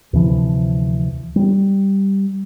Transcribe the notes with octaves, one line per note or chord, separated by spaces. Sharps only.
D2 C3 E3 F3
G3